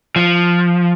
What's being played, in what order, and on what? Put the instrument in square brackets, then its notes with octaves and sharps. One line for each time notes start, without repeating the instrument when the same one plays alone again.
[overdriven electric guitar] F3